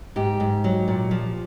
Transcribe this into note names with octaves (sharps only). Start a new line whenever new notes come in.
G#2 G4
G#2
F#3
A#2
F3